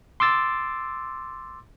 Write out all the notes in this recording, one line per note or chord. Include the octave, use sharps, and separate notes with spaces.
C6 D6 E6 A6